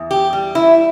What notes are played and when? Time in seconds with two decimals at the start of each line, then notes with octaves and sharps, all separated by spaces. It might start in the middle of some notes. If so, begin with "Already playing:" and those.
Already playing: E2
0.11 G4
0.33 G3
0.55 E4